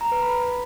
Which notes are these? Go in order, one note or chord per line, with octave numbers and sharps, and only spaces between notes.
A#5
B4
B5